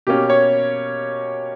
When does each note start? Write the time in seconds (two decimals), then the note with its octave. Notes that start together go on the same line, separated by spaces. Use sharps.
0.07 B2 A#3 C#4 G4
0.30 C#5